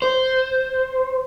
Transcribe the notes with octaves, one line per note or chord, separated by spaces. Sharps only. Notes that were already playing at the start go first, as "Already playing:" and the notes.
C5